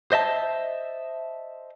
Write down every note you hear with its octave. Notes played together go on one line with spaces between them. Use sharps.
C5 D#5 E5 A5